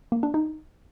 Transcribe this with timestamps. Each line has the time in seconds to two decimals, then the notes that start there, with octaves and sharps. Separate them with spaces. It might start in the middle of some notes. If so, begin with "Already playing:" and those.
0.12 A#3
0.23 D4
0.34 D#4